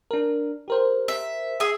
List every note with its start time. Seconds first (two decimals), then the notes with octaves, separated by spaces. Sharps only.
0.11 D4 A#4
0.68 G4 A#4 C5
1.08 E5
1.60 G#4 E5 D#6